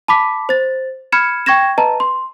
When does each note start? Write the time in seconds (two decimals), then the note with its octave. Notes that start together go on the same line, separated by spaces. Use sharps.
0.08 A5 B5 D6 B6
0.49 C5 A6
1.12 B5 F6 G#6 C#7 E7
1.46 G5 C#6 G#6 A#6 E7
1.78 B4 D#5 A5 A#5
2.00 C6